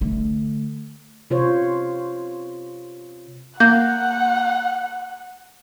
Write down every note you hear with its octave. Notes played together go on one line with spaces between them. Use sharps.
D3 A3
C3 F4 C5 C#5
A#3 F#5 G6